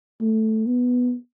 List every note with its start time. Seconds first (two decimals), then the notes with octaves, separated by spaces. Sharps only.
0.21 A3
0.66 B3